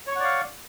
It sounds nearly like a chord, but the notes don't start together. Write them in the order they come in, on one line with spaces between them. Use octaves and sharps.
C#5 C#6 F#5 D5 F5